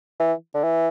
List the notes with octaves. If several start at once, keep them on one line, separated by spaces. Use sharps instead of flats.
E3
D3
E3